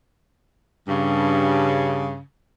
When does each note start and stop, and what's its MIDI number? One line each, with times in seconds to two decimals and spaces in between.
0.88 2.20 43
0.88 2.20 49